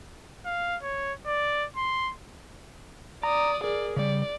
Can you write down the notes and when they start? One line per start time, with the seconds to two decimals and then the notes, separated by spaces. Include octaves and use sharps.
0.45 F5
0.83 C#5
1.26 D5
1.76 C6
3.23 D5 A#5 D#6
3.64 G#4 A#4 D5
3.96 C#3 G3 D5